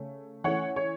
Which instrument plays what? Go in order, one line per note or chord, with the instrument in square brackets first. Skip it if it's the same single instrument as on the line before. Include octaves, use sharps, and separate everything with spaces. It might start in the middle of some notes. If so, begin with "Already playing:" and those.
Already playing: [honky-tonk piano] C#3 A3 C#4
E3 A3 C#4 C#5 F#5
C#5